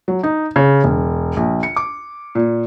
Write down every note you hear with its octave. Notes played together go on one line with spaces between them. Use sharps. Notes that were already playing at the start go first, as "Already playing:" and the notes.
F#3
D#4
C#3
E1
A#1
C#7
D6
A#2